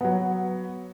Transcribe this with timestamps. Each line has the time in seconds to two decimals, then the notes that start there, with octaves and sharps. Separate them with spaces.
0.01 F#3 B3